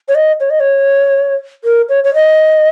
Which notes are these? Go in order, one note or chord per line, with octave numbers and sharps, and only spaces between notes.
C#5
D#5
C#5
D#5
C#5
A#4
C#5
C#5
D#5